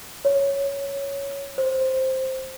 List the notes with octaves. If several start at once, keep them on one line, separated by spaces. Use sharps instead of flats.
C#5
C5